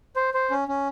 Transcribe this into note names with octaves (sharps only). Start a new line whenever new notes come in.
C5
C5
C#4
C#4